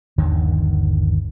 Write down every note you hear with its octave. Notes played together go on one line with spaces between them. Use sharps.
G1 D#2 D3 D#3